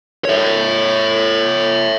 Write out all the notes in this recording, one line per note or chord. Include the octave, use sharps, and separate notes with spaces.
C#5 E5